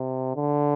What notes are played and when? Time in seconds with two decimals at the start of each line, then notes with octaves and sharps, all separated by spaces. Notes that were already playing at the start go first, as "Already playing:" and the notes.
Already playing: C3
0.35 D3